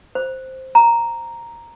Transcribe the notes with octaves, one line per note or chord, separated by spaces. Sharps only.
C5
A#5